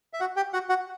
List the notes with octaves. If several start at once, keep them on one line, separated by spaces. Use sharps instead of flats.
E5
F#4 F#5
G4 G5
F#4 F#5
F#4 F#5